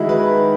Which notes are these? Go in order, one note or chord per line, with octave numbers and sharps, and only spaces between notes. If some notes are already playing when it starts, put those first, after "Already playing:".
Already playing: D#3 G#3 D#4 E4 F#4
B4